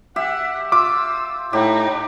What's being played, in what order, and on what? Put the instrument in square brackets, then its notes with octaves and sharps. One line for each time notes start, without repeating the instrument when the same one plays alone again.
[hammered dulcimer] G4 E5 [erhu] F#5
[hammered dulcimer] F4 [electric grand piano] D6 [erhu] E6
[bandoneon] A2 [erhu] D#4 [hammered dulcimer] G4